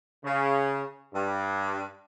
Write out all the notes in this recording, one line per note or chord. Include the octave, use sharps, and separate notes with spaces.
C#3
G2